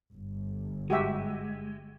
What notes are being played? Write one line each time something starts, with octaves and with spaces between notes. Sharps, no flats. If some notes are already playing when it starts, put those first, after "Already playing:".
G1
G#3 F#4 G4 E5